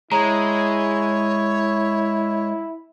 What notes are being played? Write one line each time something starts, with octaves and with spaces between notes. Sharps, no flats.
G#3 E4 C#5 A#5